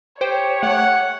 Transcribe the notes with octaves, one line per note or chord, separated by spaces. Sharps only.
G4 C5 C#5 G5
A3 F#5